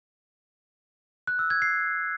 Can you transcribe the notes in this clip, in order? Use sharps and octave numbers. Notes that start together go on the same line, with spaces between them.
F#6
E6
G#6
C7